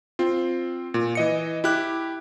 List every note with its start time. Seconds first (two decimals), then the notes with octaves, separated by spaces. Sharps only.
0.19 C4 F4
0.94 A#2
1.15 E3 D#5 C#7
1.64 E4 G4 F#6